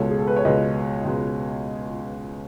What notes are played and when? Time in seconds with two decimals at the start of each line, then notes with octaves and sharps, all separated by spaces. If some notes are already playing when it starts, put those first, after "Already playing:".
Already playing: C#2 B2 G#3 A4 C#5
0.10 G#4
0.19 A4
0.28 B4
0.36 C#5
0.45 C#2 B2 G#3 B4 D#5
1.05 C#2 B2 G#3